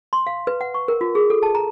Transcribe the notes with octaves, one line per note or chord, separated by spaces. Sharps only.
C6
F5
B4
F#5
C#6
A#4
F4
G#4
A4
A5
A#5